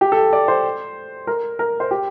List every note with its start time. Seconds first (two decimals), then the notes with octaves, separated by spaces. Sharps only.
0.01 G4
0.12 A4
0.33 D5
0.48 C5
1.27 A#4
1.59 A#4
1.80 C5
1.91 G4